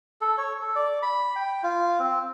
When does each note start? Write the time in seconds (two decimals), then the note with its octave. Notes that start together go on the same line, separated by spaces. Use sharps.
0.21 A4
0.38 C#5
0.61 A4
0.75 D5
1.02 B5
1.36 G5
1.63 F4
1.99 C4